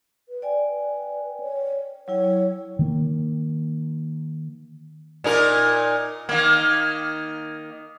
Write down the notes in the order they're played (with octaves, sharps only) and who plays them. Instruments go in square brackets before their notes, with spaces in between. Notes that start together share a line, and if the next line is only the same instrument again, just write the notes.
[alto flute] B4
[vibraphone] D5 G5 G#5
[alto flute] B4
C#5
[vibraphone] F#3 E4 G5 [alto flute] C#5
[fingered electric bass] D#3 A#3
[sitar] A#2 D#4 A#4
D#3 A#3